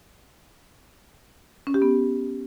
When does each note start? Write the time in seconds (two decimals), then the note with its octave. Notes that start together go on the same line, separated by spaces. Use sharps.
1.67 C#4
1.74 G4
1.82 B3